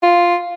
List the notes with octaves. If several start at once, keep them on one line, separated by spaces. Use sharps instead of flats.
F4